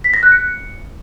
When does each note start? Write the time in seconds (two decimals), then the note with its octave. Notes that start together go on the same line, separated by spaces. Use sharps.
0.04 B6
0.14 A#6
0.23 F#6
0.32 C#7